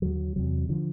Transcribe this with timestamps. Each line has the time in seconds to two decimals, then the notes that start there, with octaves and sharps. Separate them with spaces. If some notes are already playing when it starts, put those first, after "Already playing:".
0.02 D#2 D3 F#3
0.36 E2 C3 F#3
0.69 D3 F3